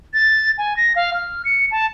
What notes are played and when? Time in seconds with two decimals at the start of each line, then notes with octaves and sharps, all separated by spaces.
0.14 A6
0.58 G#5
0.77 A#6
0.96 F5
1.14 F6
1.45 C#7
1.71 A5